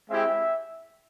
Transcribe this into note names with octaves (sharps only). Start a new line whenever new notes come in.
G#3 C4 E4 G4 E5